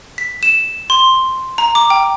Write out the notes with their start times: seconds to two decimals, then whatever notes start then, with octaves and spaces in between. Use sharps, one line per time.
0.18 B6
0.43 E7
0.90 C6
1.58 A#5
1.75 D6
1.90 G5